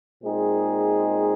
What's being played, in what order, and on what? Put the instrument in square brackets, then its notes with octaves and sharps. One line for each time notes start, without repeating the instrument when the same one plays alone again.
[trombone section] A#2 G#3 C4 D#4 G#4